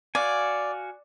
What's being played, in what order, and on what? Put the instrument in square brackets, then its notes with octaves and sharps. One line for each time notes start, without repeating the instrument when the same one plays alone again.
[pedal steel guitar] F#4 F5 G#5 [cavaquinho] D5